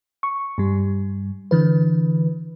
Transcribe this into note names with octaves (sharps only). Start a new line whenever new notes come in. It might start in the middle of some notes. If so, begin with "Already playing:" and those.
C#6
G2 G3
D3 E3 B4